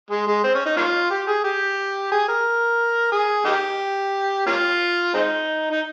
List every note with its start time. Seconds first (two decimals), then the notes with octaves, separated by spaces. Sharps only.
0.11 G#3
0.27 G#3
0.44 C4
0.55 C#4
0.66 D#4
0.77 A#3 C#4 F4
1.11 G4
1.27 G#4
1.44 G4
2.12 G#4
2.29 A#4
3.12 G#4
3.45 A#3 D#4 G4
4.47 A#3 C#4 F4
5.14 G#3 C4 D#4
5.70 D#4